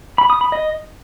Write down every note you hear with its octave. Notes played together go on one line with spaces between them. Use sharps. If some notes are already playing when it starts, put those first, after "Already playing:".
B5
D#6
B5
D#5